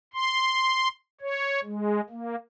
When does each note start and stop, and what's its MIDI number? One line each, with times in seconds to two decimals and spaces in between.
0.14 0.88 84
1.21 1.60 73
1.64 2.01 56
2.09 2.35 58